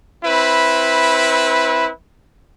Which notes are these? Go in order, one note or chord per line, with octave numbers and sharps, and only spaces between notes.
C4 E4 B4